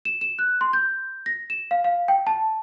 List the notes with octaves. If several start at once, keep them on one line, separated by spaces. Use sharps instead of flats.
E7
E7
F#6
C6
G6
A#6
E7
F5
F5
G5
A5